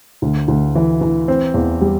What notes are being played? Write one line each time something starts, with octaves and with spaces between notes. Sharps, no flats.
D2
D2
E3
E3
C4
E2
G3